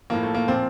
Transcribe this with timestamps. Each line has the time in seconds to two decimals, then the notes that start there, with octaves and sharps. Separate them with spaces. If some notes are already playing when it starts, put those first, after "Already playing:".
0.10 A2 F3 A#3
0.23 A3
0.35 A#3
0.48 A#2 F3 C4